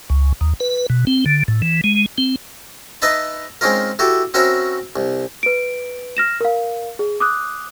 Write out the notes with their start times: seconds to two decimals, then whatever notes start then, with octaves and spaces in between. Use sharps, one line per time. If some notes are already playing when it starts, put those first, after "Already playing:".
0.10 C#2
0.41 D#2
0.60 B4
0.90 B2
1.07 C4
1.26 D3
1.48 A2
1.62 E3
1.84 G#3
2.18 C4
3.02 D#4 B4 D#5 E5 A5 B5
3.61 G#3 C4 C#4 D#4 F4 A#4
3.99 E4 F#4 G4 A4
4.34 C4 C#4 F#4 A#4 E5 B5
4.96 C2
5.43 B4 D7
6.17 F6 A#6 E7
6.41 A#4 F5
6.99 G#4
7.20 D6 D#6 F#6